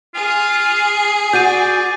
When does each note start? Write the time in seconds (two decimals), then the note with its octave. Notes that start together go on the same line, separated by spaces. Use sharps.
0.15 F4 G#4
1.33 F#4 D5 G6 D#7